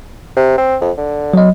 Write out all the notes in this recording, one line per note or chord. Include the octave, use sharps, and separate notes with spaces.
C3
C4
F2
D3
F#3 D#5